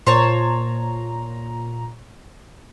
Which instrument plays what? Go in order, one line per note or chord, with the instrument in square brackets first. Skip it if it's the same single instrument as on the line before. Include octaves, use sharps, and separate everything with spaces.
[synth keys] A#2 A#5 [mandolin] C5 C#5 A5